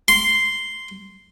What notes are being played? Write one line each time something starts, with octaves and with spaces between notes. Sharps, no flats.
C6